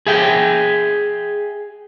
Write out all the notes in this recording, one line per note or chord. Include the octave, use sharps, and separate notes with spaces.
G#4 E5 G5